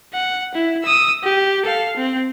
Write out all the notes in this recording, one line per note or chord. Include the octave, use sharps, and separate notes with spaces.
F#5
E4
D#6 E6
G4
A4 F5
C4